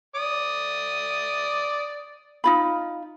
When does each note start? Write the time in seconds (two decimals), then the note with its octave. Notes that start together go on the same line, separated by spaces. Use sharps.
0.15 D5 D#6
2.44 D#4 F4 B5